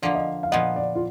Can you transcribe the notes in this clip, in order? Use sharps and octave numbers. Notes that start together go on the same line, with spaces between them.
D3 F3 A#3 D5
D#5
F5
A#2 F3 B3 D#5
D5
F4